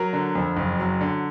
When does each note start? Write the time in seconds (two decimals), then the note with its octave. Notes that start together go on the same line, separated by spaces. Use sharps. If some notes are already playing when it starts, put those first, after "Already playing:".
Already playing: F#3 A#4
0.13 D3
0.35 F2
0.57 F#1
0.79 F#3
1.01 D3